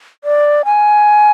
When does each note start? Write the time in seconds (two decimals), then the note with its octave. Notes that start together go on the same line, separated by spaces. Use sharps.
0.24 D5
0.65 G#5